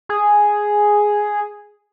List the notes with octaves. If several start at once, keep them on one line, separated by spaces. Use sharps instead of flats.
G#4